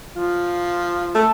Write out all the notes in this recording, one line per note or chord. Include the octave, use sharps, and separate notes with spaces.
F3 F4
A3 A4